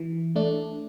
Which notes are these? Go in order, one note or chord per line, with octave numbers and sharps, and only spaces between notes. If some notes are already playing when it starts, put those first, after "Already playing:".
Already playing: E3
A3 D4